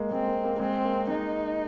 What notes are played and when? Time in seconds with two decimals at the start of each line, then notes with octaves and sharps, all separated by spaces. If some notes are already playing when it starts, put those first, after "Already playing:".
Already playing: G#3 A#3
0.11 G#3 C4
0.27 A#3
0.44 A#3
0.56 A#3
0.59 G#3 C4
0.85 A#3
1.09 G#3 D#4